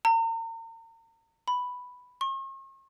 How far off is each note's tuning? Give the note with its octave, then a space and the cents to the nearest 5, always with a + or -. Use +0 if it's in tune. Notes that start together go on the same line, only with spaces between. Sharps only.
A#5 -40
B5 +0
C#6 -45